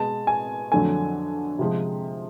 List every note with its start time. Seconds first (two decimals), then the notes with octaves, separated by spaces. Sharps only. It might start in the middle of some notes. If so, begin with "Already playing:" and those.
Already playing: B2 G#3 A5
0.27 G#5
0.71 F2 D3 F#3 A3 G#5
1.59 C3 F3 G#3